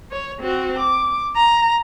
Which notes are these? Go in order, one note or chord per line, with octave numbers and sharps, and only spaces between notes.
C#5
C4 F#4
D6
A#5